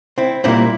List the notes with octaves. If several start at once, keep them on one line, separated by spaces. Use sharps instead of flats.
C4 E4
A#2 G3 A#3 C4 E4